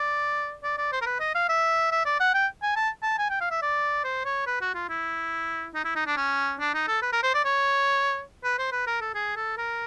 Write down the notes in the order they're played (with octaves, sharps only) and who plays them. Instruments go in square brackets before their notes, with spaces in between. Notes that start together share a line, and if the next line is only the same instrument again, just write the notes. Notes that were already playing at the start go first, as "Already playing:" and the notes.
Already playing: [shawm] D5
D5
D5
C5
A#4
B4
D#5
F5
E5
E5
D5
F#5
G5
G#5
A5
A5
G#5
G5
F5
E5
D5
C5
C#5
B4
F#4
F4
E4
D#4
E4
D#4
D4
C#4
D4
D#4
A4
B4
A#4
C5
D5
C#5
B4
C5
B4
A#4
A4
G#4
A4
A#4